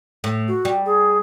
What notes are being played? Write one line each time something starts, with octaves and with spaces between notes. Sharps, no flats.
A2
F#4
G3
G#4